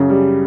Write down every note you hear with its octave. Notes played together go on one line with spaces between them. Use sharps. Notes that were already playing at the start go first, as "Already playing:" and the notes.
Already playing: F#2 C#3
G3